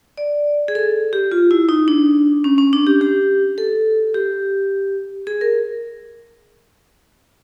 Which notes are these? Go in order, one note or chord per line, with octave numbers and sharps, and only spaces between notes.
D5
G#4
A4
G4
F4
E4
D#4
D4
C#4
C#4
D4
G4
G4
A4
G4
G#4
A#4